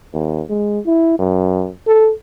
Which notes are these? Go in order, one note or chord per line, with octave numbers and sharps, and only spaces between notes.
D#2
G#3
E4
F#2
A4